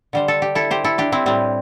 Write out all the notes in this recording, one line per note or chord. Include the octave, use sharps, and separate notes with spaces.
D3 G3 C5
A4
G4
E4 A4
G4 C5
E4 A4
D4 G4
C4 E4
A2 G3 C4